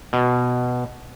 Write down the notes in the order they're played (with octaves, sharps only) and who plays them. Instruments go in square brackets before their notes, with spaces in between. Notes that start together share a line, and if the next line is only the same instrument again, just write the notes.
[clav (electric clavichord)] B2